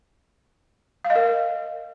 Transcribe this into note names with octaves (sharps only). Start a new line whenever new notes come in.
F5
D#5
A#4